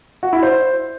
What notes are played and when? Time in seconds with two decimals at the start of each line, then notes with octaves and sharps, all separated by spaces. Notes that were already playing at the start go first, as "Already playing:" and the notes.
0.23 F#4
0.33 E4
0.43 C5